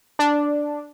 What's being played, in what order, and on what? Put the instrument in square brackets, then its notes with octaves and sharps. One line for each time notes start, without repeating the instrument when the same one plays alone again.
[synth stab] D4